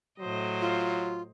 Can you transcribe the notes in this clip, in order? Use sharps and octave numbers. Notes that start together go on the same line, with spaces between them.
A2 F#3 C5 D#5
F4